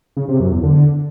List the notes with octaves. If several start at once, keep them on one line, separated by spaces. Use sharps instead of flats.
C#3
C3
F#2
E2
D3